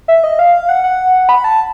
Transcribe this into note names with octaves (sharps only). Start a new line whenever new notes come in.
E5
D#5
F5
F#5
F#5
B5
A5